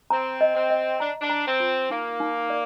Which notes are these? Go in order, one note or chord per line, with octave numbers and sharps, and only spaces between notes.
C4 A#5
D#5
C4
D#5
D4 A#5
D4
A#5
C4
F4
A#3 D#4
D#4
D5